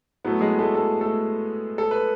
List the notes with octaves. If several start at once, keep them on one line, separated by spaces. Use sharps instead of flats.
A2 F#3 A3 B3 B4
G#3 G#4
A3 A4
A3 A4
A3 A4
A4
B4